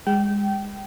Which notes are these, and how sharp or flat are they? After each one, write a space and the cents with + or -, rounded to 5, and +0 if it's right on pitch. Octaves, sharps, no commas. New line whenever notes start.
G#3 -30 G5 -25